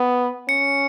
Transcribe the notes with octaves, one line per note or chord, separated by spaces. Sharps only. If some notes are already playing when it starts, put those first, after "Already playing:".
Already playing: B3
C#4 C#7